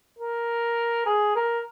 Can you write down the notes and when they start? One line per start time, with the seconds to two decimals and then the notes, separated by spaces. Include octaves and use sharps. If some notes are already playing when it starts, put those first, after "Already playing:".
0.19 A#4
1.06 G#4
1.36 A#4